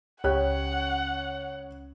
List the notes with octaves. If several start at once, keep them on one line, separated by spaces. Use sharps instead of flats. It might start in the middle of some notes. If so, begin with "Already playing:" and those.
C#2 G4 C#5 F#5 F#6